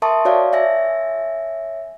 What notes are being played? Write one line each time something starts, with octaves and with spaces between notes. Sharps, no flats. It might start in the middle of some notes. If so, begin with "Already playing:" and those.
A#4 E5 A5 C6 C#6 D#6
F#4 C#5 D5 F5
C#5 E5 G#5 A#6